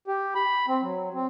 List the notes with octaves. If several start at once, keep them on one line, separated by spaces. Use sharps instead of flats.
G4
B5
C4
F#3
C4